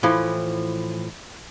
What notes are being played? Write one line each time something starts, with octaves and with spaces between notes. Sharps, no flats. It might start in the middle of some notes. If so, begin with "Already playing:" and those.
A2 E3 F3